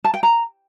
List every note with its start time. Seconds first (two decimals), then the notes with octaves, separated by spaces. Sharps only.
0.04 A5
0.14 G5
0.23 A#5